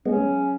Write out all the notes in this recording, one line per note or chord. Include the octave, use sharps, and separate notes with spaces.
C#3 F#3 G#3 B3 C#4